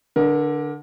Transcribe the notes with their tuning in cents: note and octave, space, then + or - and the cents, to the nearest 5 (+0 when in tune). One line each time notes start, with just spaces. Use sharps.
D3 +0 A#4 +35